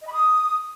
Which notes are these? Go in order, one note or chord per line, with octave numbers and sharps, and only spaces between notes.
D#5
B5
D#6